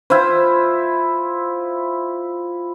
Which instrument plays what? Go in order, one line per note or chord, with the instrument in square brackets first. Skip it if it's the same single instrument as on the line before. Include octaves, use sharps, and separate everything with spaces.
[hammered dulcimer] E4 F4 C5